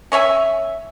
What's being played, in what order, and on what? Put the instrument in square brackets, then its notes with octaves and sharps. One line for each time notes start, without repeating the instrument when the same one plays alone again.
[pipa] C#4 C#5 E5 G#5